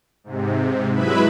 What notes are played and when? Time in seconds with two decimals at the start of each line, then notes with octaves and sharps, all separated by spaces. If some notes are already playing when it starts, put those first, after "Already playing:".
0.24 G#2 C3
0.92 F#3 G#3 E4 B4 E5 B5